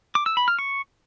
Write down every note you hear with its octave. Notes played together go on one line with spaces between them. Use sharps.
D6
E6
B5
F6
C#6